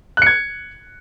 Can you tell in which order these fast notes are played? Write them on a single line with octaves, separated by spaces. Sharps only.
F#6 C#7 G#6